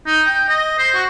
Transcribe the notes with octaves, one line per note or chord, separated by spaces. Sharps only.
D#4
G5
D#5
C5
F#4